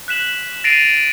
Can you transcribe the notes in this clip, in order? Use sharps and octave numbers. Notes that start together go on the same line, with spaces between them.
F#6 B6 E7 F#7
A6 A#6 C7 D7 D#7 F7